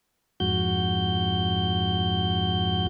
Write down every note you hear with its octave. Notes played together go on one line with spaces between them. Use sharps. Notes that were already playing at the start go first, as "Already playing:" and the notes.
F2 G#2 F#4 G6